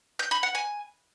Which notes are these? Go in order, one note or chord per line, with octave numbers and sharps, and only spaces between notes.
G6
B5
F#5
G#5